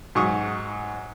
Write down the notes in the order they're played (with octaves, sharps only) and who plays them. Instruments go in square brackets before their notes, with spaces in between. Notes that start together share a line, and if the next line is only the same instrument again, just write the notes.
[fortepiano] G#2 F#3 C#6 D#6